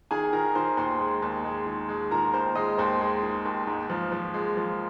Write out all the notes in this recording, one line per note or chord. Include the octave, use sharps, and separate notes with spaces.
D#3 G#4 G#5
D#3 A#4 A#5
D#3 C5 C6
D#2 C5 C6
G#3
D#2
G#3
D#3
G#3
D#3 A#4 A#5
D#2 C5 C6
G#3 D#5 D#6
D#2 C5 C6
G#3
D#3
D#2
G#2
F3
F3
G#3
F3